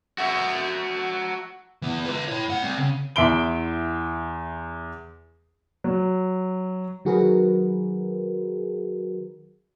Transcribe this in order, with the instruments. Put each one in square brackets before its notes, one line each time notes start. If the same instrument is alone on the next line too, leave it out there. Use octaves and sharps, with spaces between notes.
[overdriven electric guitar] F#4 E5
[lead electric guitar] E3 B3
F4 B4
E4 C#5
A2 F#5
G3 C4
C#3
[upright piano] E2 E5 C6 D7 G7
[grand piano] F#3
[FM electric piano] D#3 F#3 F#4 G#4 A#4 B4